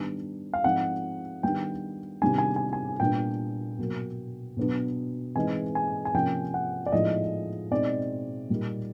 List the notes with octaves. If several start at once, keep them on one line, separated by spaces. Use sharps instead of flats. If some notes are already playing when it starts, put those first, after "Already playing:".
Already playing: D#3 G3 B3 D4
F5
F3 G#3 C4 D#4 F#5
D#3 G3 B3 D4 G5
C3 D#3 G3 B3 D4 G#5
G#5
G#5
G#5
A#2 G3 B3 D4 G5
B2 F#3 A#3
B2 F#3 B3 D4
E3 G#3 C4 D#4 G#5
G#5
G#5
C3 F3 A#3 C#4 G5
F#5
D5
A2 F3 G#3 B3 D#4 D#5
B2 G#3 C4 D#4 D5
A#2 G3 A#3 D#4